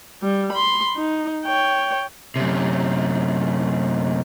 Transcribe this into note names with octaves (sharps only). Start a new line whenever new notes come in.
G3
B5 C6
D#4
C#5 G5
F#2 C3